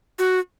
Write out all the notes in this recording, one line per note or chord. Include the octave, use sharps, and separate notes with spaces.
F#4